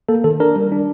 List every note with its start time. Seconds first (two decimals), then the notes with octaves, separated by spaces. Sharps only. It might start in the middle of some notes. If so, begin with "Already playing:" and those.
0.09 A#3 A4
0.24 D#3 A4
0.40 D4 A#4
0.56 G3
0.72 D4